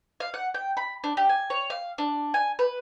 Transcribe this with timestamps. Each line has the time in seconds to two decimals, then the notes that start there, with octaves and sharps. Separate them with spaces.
0.20 F5
0.34 F#5
0.54 G5
0.77 B5
1.04 D4
1.17 G4
1.29 G#5
1.50 C#5
1.70 F5
1.98 D4
2.34 G#5
2.59 B4